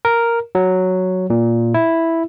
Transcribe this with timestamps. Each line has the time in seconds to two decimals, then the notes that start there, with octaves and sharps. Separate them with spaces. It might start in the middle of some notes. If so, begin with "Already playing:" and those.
0.05 A#4
0.55 F#3
1.30 A#2
1.74 E4